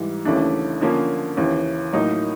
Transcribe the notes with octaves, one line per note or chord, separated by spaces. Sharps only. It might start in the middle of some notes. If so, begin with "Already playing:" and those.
Already playing: G#2 E3 G3
D#2 C#3 E3 A3 D4
D3 F3 A#3 C#4
D#2 C#3 E3
A2 F#3 A#3 D#4